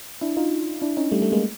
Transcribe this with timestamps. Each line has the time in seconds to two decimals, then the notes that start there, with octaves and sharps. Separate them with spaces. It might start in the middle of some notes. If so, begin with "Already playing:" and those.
0.21 D4 E4
0.37 D#4 F4
0.82 D4 E4
0.97 C#4 D#4
1.11 G3 A3
1.22 G3 A3
1.32 G#3 A#3